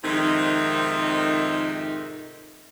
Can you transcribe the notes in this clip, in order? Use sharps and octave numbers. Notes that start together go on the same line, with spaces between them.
F2 G#2 C3 D#3 D#4